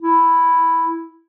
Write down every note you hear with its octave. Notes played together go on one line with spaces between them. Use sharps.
E4